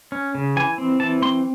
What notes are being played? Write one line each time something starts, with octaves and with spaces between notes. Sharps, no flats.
C#4
C#3
E3 G#5
C4
E3 A5
C4 C6